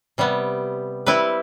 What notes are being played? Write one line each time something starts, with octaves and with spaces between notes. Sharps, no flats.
C3 G3 B3
G3 C4 E4 B4